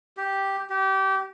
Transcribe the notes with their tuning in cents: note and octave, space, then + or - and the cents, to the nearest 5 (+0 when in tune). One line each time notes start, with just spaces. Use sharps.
G4 -5
G4 -25